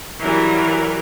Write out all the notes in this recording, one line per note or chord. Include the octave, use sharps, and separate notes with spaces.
E3 F#3 G3 A#4